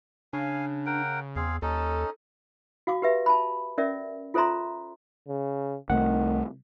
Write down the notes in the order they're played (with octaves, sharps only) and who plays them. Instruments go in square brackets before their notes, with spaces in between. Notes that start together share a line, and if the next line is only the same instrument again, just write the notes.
[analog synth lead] C#3 [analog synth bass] D4 [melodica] F5 G#5
[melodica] A#4 F#5 G5
[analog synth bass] E2 [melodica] C4 G#4 F5
[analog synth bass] D#2 [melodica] C#4 D#4 [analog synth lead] A4
[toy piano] F#4 F5 D6
G4 B4 E5
A5 B5
C#4 A#4 D5 E5
F4 A4 C5 E5 A#5 C6
[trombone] C#3
[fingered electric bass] C2 C3 A3 [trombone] D#3 [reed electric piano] F#5